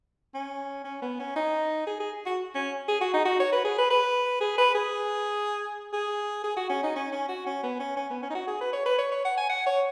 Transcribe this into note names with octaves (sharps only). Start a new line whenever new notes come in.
C#4
C#4
B3
C#4
D#4
G#4
G#4
F#4
C#4
G#4
F#4
D#4
F#4
C#5
B4
G#4
B4
B4
G#4
B4
G#4
G#4
G#4
F#4
C#4
D#4
C#4
C#4
F#4
C#4
B3
C#4
C#4
B3
C#4
D#4
F#4
G#4
B4
C#5
B4
C#5
C#5
F#5
G#5
F#5
C#5